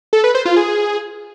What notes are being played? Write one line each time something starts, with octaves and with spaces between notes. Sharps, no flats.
A4
B4
C5
F4
G#4